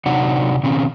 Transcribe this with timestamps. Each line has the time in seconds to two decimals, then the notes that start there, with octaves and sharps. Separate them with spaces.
0.06 C3 F#3 D4 D#4 F#5
0.64 B2 D#3 C4 C#4